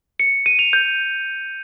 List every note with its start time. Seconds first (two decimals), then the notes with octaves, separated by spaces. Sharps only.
0.20 C#7
0.46 D#7
0.59 F7
0.73 G6